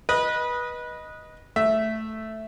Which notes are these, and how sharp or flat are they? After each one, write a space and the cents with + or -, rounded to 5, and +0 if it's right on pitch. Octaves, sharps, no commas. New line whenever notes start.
B4 -20 D#5 +0
A3 +0 E5 +0